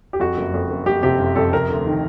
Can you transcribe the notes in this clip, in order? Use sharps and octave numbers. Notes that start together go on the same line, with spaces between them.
G4
F2 F#4
F#1
F2
F#1
F#1 G4
C3 G4
F#1
F2 A4
C3 A#4
D2
D#3